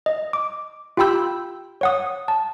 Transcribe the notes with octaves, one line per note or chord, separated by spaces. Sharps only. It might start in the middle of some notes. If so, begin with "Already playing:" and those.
D#5
D6
F4 G4 G5 B5 E6 G6
C#5 F#5 D#6
A5